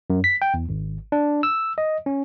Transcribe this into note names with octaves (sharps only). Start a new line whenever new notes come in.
F#2
B6
G5
E2
G#1
D4
E6
D#5
C#4